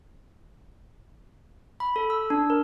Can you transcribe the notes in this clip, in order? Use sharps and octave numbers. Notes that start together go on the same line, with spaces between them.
B5
A4
E6
D4
A#4